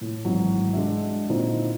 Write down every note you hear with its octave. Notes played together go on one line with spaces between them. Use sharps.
A2
G#1 G#2 E3 F#3
G#3 D4 F#4 E5
A#2 D3 C4 D#4 E4